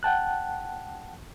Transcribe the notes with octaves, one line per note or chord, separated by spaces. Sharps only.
F#5 G5 A5 F#6